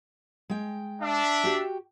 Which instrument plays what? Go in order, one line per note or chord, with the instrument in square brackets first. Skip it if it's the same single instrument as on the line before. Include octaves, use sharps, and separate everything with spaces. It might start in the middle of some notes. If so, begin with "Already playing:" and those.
[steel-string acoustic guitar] G#3 G5
[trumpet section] D4 E5
[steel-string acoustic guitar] F#4 G4 G5